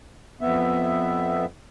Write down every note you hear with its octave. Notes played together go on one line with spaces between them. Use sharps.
F2 B3 E5